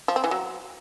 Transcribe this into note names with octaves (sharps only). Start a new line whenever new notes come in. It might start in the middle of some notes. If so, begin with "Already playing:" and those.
F3
C4
E3
F#3